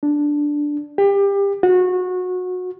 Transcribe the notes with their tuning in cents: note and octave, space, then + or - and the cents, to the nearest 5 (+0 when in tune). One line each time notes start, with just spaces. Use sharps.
D4 +0
G4 +25
F#4 -25